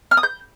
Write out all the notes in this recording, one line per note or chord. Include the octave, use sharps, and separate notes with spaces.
F6
D#6
G6